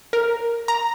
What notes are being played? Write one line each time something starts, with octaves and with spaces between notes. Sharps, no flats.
A#4
A#5